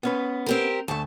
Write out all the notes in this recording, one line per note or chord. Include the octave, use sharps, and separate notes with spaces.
B3 C#4 B4
C4 G4 A#4
D2 A3 A5